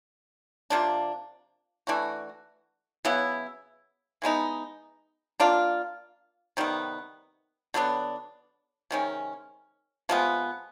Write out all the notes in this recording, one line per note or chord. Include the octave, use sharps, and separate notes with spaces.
C3 F3 A#3 D4
E3 A3 D4 F#4
C#3 F#3 B3 E4
E3 G#3 B3 D#4
A#3 D4 F4
C3 D#3 G3 B3
D3 F#3 B3 D4
C3 D#3 G#3 C#4
C3 F3 G#3 B3